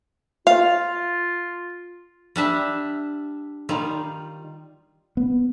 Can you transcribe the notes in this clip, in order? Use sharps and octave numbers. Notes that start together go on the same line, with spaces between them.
F4 F5
G3 D4 E5
D#3 G3 F4
B3